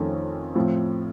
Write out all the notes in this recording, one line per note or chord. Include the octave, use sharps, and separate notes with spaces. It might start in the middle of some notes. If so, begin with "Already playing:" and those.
Already playing: F2 D#3 A3 C#4
A2 F3 C4